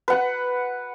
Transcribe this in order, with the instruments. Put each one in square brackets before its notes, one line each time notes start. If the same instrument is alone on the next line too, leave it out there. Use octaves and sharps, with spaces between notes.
[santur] B4 F#5